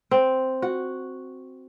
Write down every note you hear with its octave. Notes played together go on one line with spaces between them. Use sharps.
C4
F#4